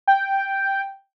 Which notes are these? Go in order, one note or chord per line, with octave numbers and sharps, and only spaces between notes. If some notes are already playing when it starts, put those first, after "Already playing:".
G5